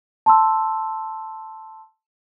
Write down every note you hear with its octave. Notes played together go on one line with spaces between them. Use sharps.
A5 C6 E6